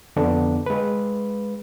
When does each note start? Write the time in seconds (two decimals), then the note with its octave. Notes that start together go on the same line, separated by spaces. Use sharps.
0.16 F2 D3 B3 D4
0.66 G#3 B4